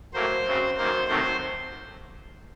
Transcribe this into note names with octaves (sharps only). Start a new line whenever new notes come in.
A2 F#3 A#3 C5
F#2 C#3 F#3 C4
F#2 D#3 A#3 C5
C3 D#3 F#3 A3 C5